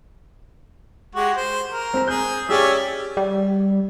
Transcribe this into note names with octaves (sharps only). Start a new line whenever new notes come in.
G#3 F#4 G4
C5
A#4
C4 A#5
G#4 G6
C#4 G4 G#4 D5 E5
G3